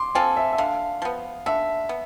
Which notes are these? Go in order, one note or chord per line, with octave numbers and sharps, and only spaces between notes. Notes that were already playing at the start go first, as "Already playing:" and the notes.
Already playing: C6 D6
C4 F4 A4 G#5
E5
E5
D3 F5
F3 B3
D3 E5
B3